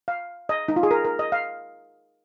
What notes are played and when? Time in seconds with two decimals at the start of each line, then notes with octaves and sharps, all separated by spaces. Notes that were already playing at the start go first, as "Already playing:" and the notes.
0.08 F5
0.49 D#5
0.68 D#4
0.76 F4
0.83 G#4
0.91 A#4
1.05 A#4
1.19 D#5
1.32 F5